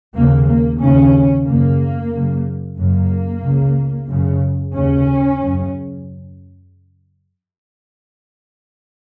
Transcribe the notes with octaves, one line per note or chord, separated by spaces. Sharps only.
D#2 C#3 A#3
A#3
D#2 C#3 C#4
F#2 C#3 A#3
F#2 C#3
F#2 C#3 A#3
C#2 C#3
F#2 C#3
D#2 C#3 C#4
F#2 C#3